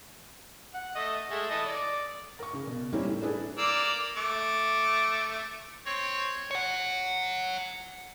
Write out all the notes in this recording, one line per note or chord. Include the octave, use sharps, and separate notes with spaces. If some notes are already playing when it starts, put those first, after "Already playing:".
F#5
A3 D#5
G#3 A3
E3 A4 D#5
D5
A#4 C#6
C#3
B2
G3 A#3 C4 C#4 D#4 E4
A2
D4 E4 G#4 A4 B4
A#3 D5 E6
A3 D6
C4 C#5
C#5 F#5